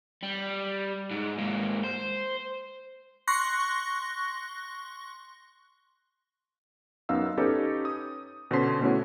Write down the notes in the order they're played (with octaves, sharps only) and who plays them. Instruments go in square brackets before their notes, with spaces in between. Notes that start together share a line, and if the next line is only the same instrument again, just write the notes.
[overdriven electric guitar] G3
G#2
G#2 A#3
C5
[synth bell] C6 C#6 F#6 A#6
[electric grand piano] F#2 B3 D#4 F5 E6
C#4 D#4 G4 A4 B4 C#5
D#6
B2 D3 C#4 C5 C6 B6
B2 A3 C#4 E4 F#4 C#5